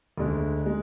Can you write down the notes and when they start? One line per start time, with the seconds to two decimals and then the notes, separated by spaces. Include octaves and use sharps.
0.18 D2 D3 G#3
0.66 G#3